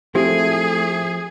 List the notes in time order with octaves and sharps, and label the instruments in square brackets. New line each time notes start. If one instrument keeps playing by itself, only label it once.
[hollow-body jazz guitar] F3 C4 E4 [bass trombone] A3 [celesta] G4 [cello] G#4